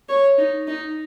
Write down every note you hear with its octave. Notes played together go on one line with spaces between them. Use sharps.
C#5
D#4
D#4